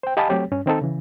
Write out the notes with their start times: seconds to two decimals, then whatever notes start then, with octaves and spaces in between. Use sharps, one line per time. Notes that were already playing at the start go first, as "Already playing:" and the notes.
0.03 C5 G5
0.17 G4 D#5 F5 G#5 A5 B5
0.29 F#3 A3 C4 G4 C#5
0.52 G2 C#4
0.66 D#3 C4 D#4 A4
0.81 C#3 E3